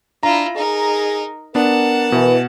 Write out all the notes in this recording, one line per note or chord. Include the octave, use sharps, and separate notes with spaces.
D4 E4 F4 A#5
D#4 G#4 A#4
B3 D4 A#4 F#5 A5
B2 E3